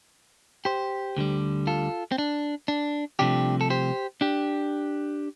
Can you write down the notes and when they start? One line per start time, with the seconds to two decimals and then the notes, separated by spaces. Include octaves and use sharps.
0.65 G4 C5
1.17 D2 D3 G3
1.67 F4 A4
2.12 C4
2.18 D4
2.68 D4
3.19 C2 C3 F3 A3 D4 G4
3.61 A4
3.70 G4 C5
4.21 D4 G4